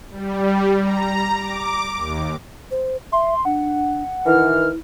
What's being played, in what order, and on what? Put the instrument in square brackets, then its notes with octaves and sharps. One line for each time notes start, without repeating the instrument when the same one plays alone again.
[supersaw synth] G3
A#5
D6
D#2
[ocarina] C5
[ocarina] E5 [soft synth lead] C6
[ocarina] D4 [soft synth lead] F#5
[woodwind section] D#3 E3 F6 [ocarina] E4